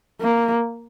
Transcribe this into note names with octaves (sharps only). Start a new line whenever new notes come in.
A#3